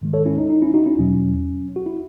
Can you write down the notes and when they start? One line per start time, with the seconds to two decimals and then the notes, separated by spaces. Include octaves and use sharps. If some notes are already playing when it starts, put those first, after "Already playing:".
0.01 G#2 D#3 G#3
0.13 A4 C#5
0.25 C#4 E4
0.38 D#4
0.50 D#4
0.62 C#4 E4
0.74 D#4 F#4
0.86 C#4 E4
0.98 E2 B2 F#3 C#4
1.76 F#4
1.86 E4